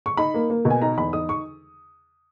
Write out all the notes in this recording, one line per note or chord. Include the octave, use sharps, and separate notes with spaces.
C#6
D#4 B5
A#3
A#3
B2
G#5
D#4 A#5
E2 B5
D#4 D#6
C#6